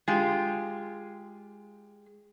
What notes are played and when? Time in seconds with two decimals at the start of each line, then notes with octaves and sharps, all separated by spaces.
0.08 G#3 F4 G4